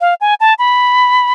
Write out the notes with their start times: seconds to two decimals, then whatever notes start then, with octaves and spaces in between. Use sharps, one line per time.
0.01 F5
0.21 G#5
0.40 A5
0.59 B5